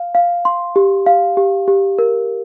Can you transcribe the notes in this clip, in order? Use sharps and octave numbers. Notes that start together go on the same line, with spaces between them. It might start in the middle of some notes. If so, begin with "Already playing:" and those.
Already playing: F5
F5
C6
G4
F5
G4
G4
A#4